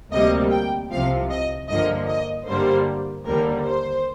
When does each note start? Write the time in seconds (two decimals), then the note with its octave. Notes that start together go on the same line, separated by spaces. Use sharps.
0.12 D2 C3 G3 A#3 D#5
0.52 G5
0.90 C2 C3 F3 F5
1.30 D#5
1.68 G2 D3 F3 A#3 D#5
2.08 D#5
2.47 G2 D3 G3 A#3 C5
3.25 D#2 D3 G3 A#3 A#4
3.64 C5